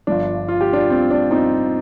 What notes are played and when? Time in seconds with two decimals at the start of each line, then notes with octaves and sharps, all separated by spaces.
0.07 G1 G2 F3 D4
0.48 F4
0.61 G4
0.73 D4 F4
0.90 C4
1.11 D4
1.31 C4 D#4